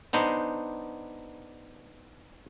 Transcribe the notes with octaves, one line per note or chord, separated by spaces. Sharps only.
B3 D4 D#4 C5